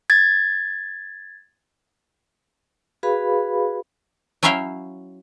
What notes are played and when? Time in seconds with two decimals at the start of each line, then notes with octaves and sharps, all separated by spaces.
0.10 G#6 A6
3.03 F#4 G#4 B4 F5 B5
4.43 F#3 C#4 E4 E5 F5 G5